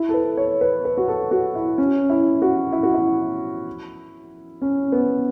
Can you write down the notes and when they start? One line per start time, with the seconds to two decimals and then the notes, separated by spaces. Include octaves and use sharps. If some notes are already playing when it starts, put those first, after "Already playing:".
Already playing: E4
0.09 A4
0.14 B4
0.37 C#5
0.61 B4
0.85 B4
0.97 F#4
1.08 A4
1.31 F#4
1.55 E4
1.78 C#4
2.10 E4
2.42 F#4
2.73 E4
2.83 F#4
2.94 E4
4.62 C#4
4.92 B3